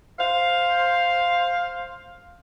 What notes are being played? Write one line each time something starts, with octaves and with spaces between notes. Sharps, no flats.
C5 F5